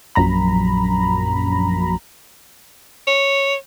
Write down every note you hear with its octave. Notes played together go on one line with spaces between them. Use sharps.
A#1 F#2 A#5 B5
C#5